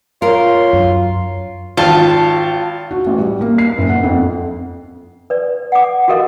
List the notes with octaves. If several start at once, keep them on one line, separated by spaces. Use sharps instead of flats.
F4 A#4 C#5
F#2
G#1 F4 A5
F#4
A1
G3
A#3
C7
F#1
F#5
F2
B4 D5
F#5 D6
F#4 G4 A4 A#4 D#5 F5